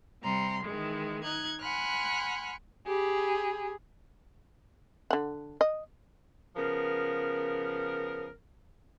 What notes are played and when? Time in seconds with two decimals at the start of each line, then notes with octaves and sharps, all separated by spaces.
0.22 C3 G3 A#5 C6
0.63 D#3 E3 G#3
1.24 D#4 F#6 G#6
1.60 F#5 G#5 B5 C6 F6 F#6
2.86 G4 G#4 B5
5.11 D3 F#5
5.61 D#5
6.56 C#3 F3 B3 A#4